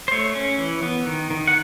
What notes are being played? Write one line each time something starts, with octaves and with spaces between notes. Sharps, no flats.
C5
A3 C#5
C#4
E3
B3
D#3
D#3
F#5